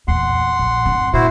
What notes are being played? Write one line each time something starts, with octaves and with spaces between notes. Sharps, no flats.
E2 A#2 F#5 C6
A#1
G1 C4
A#2 E4 F#4 C5